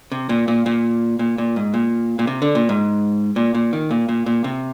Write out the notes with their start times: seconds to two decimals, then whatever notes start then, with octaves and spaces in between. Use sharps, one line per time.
0.12 C3
0.29 A#2
0.48 A#2
0.66 A#2
1.19 A#2
1.38 A#2
1.56 G#2
1.74 A#2
2.19 A#2
2.27 C3
2.42 D3
2.55 A#2
2.69 G#2
3.36 A#2
3.55 A#2
3.73 D#3
3.91 A#2
4.09 A#2
4.26 A#2
4.44 C3